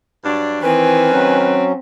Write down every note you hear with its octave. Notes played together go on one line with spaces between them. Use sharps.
G2 F#3 D4
D#3 E3 C4 B4 G#5
F#3 C#4